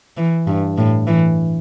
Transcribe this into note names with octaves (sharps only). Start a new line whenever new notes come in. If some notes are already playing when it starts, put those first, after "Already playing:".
E3
G2
A2
E3